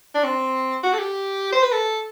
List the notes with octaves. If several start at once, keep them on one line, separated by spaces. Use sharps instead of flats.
D4
C4
F#4
A4
G4
C5
B4
A4